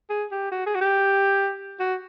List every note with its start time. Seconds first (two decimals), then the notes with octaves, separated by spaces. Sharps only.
0.10 G#4
0.32 G4
0.52 F#4
0.67 G#4
0.75 F#4
0.81 G4
1.80 F#4